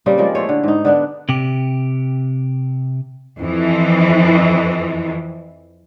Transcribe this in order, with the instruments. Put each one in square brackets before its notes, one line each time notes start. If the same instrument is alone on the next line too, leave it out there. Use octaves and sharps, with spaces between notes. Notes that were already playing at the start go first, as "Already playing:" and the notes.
[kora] C#3 G3 A#3 C4
F3 G#3 A#4 D5
A3 E4 C5 C#5
D3
G#2 D#4
D3 B3 D4
[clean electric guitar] C3 G4
[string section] F2 E3